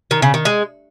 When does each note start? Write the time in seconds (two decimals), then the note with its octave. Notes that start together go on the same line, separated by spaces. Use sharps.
0.11 D#3
0.22 C#3
0.34 D#3
0.45 G#3